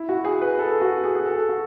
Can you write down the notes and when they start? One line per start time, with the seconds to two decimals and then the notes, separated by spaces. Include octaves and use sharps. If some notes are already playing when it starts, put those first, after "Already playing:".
Already playing: E4
0.09 F#4
0.25 G#4
0.41 B4
0.59 A4
0.81 F#4
1.04 G#4
1.15 G#4
1.26 A4
1.49 F#4